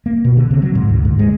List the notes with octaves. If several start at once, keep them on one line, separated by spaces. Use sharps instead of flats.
A#3
B2
D3
C3
F#3
G#2
D2
G#2
G#3